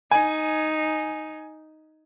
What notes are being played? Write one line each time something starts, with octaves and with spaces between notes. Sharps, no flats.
D#4 G#5